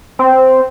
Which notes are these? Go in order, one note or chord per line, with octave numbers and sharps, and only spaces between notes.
C4